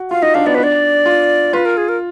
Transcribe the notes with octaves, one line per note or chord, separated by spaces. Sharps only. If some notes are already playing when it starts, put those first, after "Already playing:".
Already playing: F#4
F4 F5
D#4 D#5
D4 F5
B3 D5
D4 B4
D5
F4
F4 B4
A#4
G#4
A#4